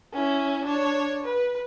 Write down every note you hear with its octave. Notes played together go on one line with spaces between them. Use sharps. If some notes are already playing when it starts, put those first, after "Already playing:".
C#4 E4
D4 C#5
B4